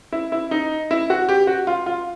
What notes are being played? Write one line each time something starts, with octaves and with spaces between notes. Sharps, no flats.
E4
E4
D#4
E4
F#4
G4
F#4
F4
F4